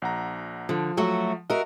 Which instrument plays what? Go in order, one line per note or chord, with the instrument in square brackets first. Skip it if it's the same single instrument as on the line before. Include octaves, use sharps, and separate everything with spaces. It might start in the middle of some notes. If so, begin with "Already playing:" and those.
[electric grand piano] A#1 F#5 A#5
[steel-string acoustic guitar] D3 [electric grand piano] F3
[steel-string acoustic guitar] F#3 A3 F#4
[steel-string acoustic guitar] F#4 A#4 [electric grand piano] D#5 E5